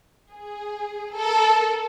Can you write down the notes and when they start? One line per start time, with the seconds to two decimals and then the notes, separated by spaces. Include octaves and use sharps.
0.32 G#4
1.15 A4 A#4